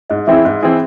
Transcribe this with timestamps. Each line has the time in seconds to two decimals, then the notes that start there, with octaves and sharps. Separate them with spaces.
0.10 G#2 D#5
0.27 E3 C4 E4 G#4 E5
0.45 G#2
0.63 E3 C4 E4 G#4